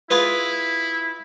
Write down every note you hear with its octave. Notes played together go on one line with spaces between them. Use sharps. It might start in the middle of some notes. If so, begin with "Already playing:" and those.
E4 F4 G#4 B4